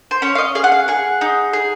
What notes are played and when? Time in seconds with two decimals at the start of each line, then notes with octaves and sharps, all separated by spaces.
0.11 C5
0.22 C#4 C#5
0.35 F5
0.38 D#5
0.55 G#4 F5
0.64 F#5
0.72 F5
0.88 G#4 F#5
1.21 D#4
1.53 G#4